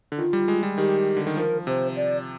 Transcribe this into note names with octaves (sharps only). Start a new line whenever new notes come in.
D3
D#3 F4
G3
G#3
G3
D#3 G4
D3
D#3
F3 A#4
C3 C5
D5